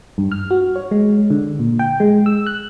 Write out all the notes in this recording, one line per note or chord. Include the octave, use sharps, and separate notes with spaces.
G2
F6
F#4
C#5
G#3
D3
A#2
G5
G#3
E6
F#6